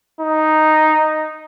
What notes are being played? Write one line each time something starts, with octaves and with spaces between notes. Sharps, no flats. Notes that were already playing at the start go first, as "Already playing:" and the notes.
D#4